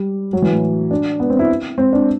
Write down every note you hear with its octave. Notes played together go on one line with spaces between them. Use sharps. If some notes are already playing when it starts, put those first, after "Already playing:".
Already playing: G3
F#3
E3
A2
D4
B3
C4
E4
C4
D4